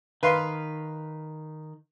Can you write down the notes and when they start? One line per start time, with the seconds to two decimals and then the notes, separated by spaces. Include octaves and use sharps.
0.23 D#3 B4 F5 C6